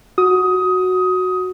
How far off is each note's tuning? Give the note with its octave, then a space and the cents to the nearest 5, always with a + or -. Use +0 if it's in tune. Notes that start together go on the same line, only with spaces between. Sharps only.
F#4 -5 D#6 +15